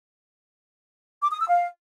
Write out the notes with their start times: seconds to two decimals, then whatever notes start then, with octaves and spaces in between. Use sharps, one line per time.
1.22 D6
1.30 D#6
1.39 E6
1.48 F5